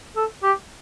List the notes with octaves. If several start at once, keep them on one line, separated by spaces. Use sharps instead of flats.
A4
G4